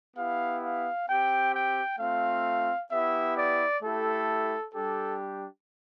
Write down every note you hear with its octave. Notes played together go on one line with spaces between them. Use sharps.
B3 E4 G4 F5
F5
C4 G4 G5
G5
A3 C4 F4 F5
B3 E4 G4 E5
D5
A3 E4 G4 A4
G3 D4 G4 A4